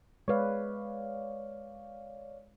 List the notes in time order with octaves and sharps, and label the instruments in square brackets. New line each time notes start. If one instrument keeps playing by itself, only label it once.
[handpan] G#3 B4 [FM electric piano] C#5 D5 F5